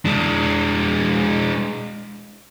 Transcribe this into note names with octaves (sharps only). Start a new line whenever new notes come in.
G#3 D4